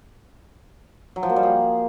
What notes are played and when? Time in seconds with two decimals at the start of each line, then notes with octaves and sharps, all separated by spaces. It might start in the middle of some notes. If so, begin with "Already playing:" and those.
1.16 F#3
1.23 F3
1.30 A#3
1.36 G3
1.43 G#4